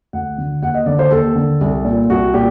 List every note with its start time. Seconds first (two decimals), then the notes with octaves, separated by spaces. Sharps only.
0.13 D2 F#5
0.38 D3
0.62 D#2 F#5
0.74 D#5
0.86 D3 D5
0.99 C5
1.11 D#2 A4
1.35 D3
1.61 C2
1.85 A#2
2.10 C2 F#4
2.34 A#2 G4